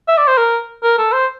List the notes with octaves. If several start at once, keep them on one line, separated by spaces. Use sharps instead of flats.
E5
D5
C5
A#4
A#4
A4
C5